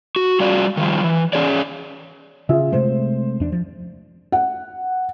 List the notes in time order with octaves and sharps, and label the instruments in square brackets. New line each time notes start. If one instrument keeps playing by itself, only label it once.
[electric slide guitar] F#4
G3 C#4 F4 F#4 D5
D#3 F3 G3
E3
C#4 G#4 C#5 D5
[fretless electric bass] C#3 [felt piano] F4 G#4 E5
[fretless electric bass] C3 G#3 A3 [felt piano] C5
[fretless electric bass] E2 D4
F3
[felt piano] F#5